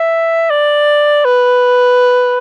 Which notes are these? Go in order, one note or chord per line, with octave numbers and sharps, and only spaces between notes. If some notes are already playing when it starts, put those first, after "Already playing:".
Already playing: E5
D5
B4